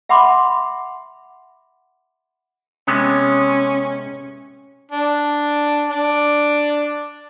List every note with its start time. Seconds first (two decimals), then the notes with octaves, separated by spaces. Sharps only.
0.09 E5 F#5 B5 C6 D6
2.88 C3 G#3 B3 C#4
4.91 D4
5.91 D4 D5